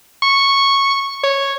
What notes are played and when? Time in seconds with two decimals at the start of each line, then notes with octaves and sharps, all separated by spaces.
0.23 C#6
1.24 C#5